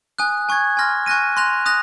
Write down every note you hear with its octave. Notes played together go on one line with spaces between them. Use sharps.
G#5 D#6 F#6
G#5 C#6 G#6
G#5 C6 F6 A#6
G#5 C#6 F#6 A#6 D#7
C6 F#6 A#6 F7
D#6 F#6 A#6 F7